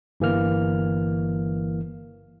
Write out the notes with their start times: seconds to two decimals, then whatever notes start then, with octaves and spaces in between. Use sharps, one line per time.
0.20 G1 E3 A#3 F6